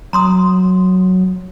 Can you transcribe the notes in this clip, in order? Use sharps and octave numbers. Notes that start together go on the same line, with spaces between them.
F#3 A#5 C6 D#6